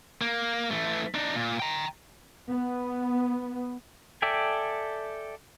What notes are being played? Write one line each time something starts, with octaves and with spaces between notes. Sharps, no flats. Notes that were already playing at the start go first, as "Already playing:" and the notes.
A#3
E3 A3
D4 D#4
A#2
G5 A#5
B3
A4 D5 E5 G5 G#5